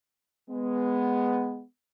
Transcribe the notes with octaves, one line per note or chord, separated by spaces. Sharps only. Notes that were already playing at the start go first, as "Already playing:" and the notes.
G#3 B3